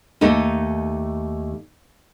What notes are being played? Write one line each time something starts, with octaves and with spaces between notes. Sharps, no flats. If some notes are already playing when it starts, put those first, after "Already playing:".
D#2 A3 D#4